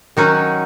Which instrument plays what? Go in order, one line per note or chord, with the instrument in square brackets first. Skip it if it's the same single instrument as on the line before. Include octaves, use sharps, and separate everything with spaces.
[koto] D#3 F#3 C#4 D#4 F#4